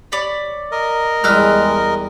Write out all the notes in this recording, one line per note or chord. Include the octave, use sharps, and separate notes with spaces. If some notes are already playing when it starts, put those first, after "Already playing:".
C#5 D5 B5
A#4 D#5
E2 G3 G#3 B4 E6 F6